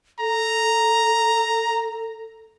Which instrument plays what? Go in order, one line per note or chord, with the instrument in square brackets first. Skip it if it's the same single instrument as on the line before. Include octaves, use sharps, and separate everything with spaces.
[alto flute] A4 [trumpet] A#5